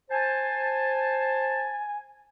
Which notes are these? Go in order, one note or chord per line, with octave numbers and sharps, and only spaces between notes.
C5 G#5 A5